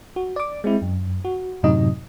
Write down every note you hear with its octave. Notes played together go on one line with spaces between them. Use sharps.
F#4
D5 D6
G#3 C4 E4
F#2
F#4
F#2 A2 C3 F#3 D#4 D#5